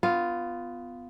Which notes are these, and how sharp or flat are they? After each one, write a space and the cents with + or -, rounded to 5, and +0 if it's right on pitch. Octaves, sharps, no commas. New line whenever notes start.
B3 +20 F4 +0